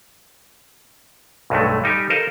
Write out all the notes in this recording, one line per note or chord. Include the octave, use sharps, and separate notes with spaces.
B1 G2 B2 F#3 G#3 A3
G3 D#4 G4 G#5
A4 A#4 C5 D#5 F5